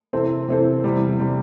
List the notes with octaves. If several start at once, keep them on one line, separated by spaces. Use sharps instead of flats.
C3 E3 C4 A4 C5
C3 E3 C4 A4 C5
E2 C3 G3
C3 G3